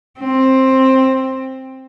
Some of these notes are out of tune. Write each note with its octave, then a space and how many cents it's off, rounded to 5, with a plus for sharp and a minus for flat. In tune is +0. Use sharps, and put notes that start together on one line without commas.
C4 +10